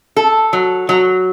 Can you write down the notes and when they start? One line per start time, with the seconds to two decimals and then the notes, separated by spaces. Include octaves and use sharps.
0.17 A4
0.53 F#3
0.89 F#3